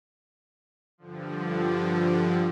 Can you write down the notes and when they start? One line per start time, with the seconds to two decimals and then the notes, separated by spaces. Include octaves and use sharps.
0.98 G2 D3 F3